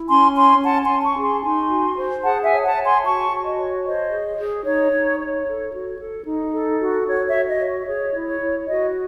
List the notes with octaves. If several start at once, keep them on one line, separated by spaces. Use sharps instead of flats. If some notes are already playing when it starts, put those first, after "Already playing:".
Already playing: E4
C#4 G#5 C6
C#5 G#5 C6
C#4 F#5 A5
G#5 C6
C#4
A5 C#6
G#4
G#5 C6
D#4 G#5 C6
F#4
C5
G#4 F#5 A5
E5 G#5
C#5
F#5 A5
C#5
G#5 C6
F#4 A5 C#6
F#4
D#5
C#5
C5 D#5
G#4
G#4
D#4 C#5
D#4
C#5
A4
F#4
A4
D#4
A4
F#4
F#4 C#5
C#5 E5
F#4
D#5
C#5
G#4 C#5
E4
C#5
E4
F#4 D#5